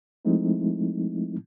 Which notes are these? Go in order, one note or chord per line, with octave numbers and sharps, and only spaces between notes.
F3 G#3 A3 C4 D#4 E4